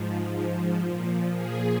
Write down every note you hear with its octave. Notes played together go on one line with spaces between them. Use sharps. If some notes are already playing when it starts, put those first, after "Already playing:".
Already playing: G#2 F3
A#2 F3
G#4